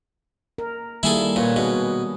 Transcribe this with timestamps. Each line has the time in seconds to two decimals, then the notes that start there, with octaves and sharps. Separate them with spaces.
0.58 A#4
1.03 D#3 G3 A#3 E4 G#4 A4
1.36 A#2 B4 C#5
1.56 B2 G#4